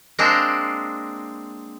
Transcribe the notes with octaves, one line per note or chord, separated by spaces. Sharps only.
G#3 A#3 C4 D4